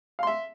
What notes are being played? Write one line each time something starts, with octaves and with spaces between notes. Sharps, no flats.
E5 F5 C6